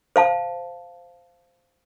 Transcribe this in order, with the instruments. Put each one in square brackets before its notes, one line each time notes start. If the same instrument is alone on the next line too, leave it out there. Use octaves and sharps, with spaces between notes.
[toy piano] C5 F5 A5